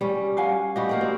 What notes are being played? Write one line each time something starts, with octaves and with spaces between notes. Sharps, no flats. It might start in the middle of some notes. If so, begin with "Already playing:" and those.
G3 C#4
F5 F#5 G#5
G3 F#4 G4 D#5
A#3 A#4 G5
C4